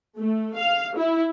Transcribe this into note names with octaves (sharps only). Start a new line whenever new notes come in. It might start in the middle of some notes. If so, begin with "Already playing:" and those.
A3
F5
E4